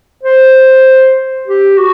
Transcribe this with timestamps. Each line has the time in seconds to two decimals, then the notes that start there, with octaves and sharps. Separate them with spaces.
0.23 C5
1.48 G4
1.78 F#4